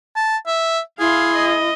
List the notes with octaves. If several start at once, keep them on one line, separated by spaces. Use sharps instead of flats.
A5
E5
E4 G#4 F5 C6
D#5